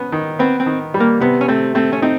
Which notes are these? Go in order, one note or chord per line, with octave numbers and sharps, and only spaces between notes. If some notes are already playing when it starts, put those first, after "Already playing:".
Already playing: B3 C#4
D#3
B3 C4
C4
D#3
G3
A#3
C3 B3
C#4
A3 C4
A3 C4
C#4
C4 D#4